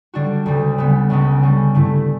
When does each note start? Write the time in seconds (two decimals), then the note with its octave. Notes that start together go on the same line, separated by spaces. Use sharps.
0.14 D3 G3 D4 F#4
0.46 D2 C#3 G3
0.78 C#3 G3 B3
1.10 C#2 C#3 G3 C#4
1.43 D3 G3 C#4
1.75 G2 D3 A3 E4